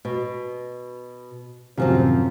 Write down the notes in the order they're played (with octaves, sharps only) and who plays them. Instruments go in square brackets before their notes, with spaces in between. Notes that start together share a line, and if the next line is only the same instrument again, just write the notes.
[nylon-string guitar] B2
[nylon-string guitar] F#2 F3 C4 [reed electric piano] A2 C3 D#3